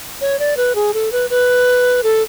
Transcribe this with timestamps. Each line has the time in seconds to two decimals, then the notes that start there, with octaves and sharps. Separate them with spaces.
0.21 C#5
0.39 D5
0.57 B4
0.75 G#4
0.94 A4
1.12 B4
1.30 B4
2.03 A4